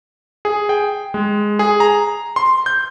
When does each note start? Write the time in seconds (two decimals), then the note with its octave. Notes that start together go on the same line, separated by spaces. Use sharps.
0.45 G#4
0.69 G5
1.14 G#3
1.59 G#4
1.80 A#5
2.36 C6
2.66 G6